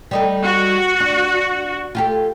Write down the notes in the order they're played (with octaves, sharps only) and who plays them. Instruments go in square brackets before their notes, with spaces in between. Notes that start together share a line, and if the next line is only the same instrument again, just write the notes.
[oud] G3 D#4 A4
[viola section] F#4
[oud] D4
F4 G4 A4